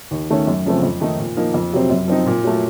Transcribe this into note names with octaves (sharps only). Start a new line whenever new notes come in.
D#2
D#3 A3 C#4
F#2
C#3 F3 A3 C4
F2
D#3 A3 D#4
A#2
F3 A#3 D#4
F2
C3 F#3 C4
F#2
F3 C4 D#4
A#2
F#3 A3